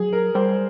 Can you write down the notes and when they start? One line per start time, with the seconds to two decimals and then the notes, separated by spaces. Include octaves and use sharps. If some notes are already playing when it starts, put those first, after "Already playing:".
Already playing: F#3 G#4
0.13 A#4
0.35 G3 C5